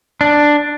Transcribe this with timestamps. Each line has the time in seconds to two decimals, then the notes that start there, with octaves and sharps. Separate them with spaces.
0.21 D4